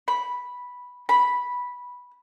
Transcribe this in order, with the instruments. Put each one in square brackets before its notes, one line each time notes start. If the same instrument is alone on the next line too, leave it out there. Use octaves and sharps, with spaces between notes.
[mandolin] B5
B5